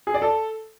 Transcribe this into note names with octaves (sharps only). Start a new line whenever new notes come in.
G#4
D5
A4